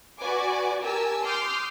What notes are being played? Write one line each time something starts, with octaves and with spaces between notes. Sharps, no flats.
F#4 B4 D5 G#5 D6
G4 A#4 G#5 A5 E6
C6 D6 D#6 F6 G6